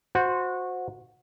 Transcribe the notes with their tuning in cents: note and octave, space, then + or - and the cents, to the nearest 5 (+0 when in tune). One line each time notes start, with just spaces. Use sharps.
F#4 -20 C5 +0